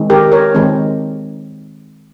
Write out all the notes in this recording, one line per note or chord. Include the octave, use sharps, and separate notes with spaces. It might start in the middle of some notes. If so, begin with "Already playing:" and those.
Already playing: D#3 G#3 C4
G4 A#4
A#4 C#5
D#3 G#3 C4